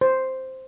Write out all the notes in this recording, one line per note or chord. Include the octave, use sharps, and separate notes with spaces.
C5